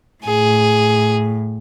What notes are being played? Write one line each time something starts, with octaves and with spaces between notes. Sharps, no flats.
A2 G#4